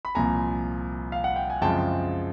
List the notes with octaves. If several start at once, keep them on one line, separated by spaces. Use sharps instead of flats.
B5
C2 A#2 F3 G#5 A#5
F5
F#5
G5
G#5
F#2 C#3 F3 G#3 C4 G5 A5